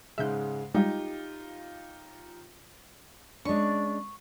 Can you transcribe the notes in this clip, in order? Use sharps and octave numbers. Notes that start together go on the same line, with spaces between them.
G#2 C#3 G#3 E5 G6
G3 G#3 D#4 F4 G4
G#3 C#4 D4 C#6